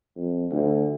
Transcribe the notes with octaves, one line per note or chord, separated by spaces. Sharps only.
F2
D2